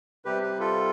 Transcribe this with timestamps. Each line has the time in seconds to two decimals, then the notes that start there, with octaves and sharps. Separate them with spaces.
0.25 C3 G3 G4 B4
0.43 G4 B4
0.60 F4 A4